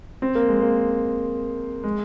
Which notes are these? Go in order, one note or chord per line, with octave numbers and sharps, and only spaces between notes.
C4
A#3
G#3
A#3
G#3